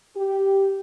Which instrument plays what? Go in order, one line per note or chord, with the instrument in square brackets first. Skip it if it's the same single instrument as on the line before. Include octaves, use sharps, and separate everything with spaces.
[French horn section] G4